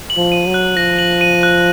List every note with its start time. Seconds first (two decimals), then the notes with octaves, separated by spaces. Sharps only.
0.10 F#7
0.17 F3
0.32 D#7
0.47 F#3
0.54 F#6
0.77 F3 A#6
0.99 F#7
1.21 D#7
1.43 F#6